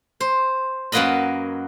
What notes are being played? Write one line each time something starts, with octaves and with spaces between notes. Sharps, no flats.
C5
F#2 F#3 A#3 B4 D#5 B5